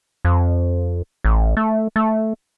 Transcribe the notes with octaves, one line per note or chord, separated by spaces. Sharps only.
F2
A1
A3
A3